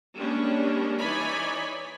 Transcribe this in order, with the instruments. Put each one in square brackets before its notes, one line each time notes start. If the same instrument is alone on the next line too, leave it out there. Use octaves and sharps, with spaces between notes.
[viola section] G3 G#3 A#3 C#4 D4
E3 D#4 C#5 D5 G#5 B5